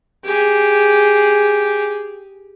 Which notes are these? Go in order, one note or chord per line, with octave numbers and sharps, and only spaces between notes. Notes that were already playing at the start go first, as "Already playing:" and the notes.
G4 G#4